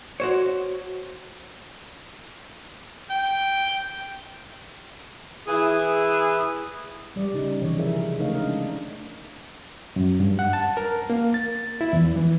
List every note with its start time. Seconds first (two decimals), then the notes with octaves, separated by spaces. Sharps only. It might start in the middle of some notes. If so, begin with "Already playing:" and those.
0.20 F#4 C5 C#5
3.11 G5
5.47 E3 E4 G#4
7.16 G3 D5
7.34 C#3 D#4
7.62 C3 E3 F3 C#5
7.76 D3 E4 G#4 A#4 E5
8.19 C#3 A3 D#4 A#4 C#5 F5
8.35 G#3 D4
9.96 F#2
10.20 G2
10.39 F#5
10.53 A5
10.77 A#4
11.10 A#3
11.34 A6
11.81 E4
11.93 E2
12.16 E3